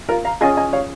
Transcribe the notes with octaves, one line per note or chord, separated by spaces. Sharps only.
F4 A#4
F5 A#5
C#4 F4 G#4 D#5 G#5
D#5 G#5
C#5 F5